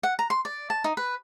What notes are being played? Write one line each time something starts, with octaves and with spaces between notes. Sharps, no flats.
F#5
A#5
C6
D5
A5
D#4
B4